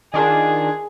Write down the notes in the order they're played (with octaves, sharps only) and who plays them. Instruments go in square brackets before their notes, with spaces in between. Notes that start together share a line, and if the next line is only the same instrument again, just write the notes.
[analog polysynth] D#3 D4 F4 [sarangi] G#4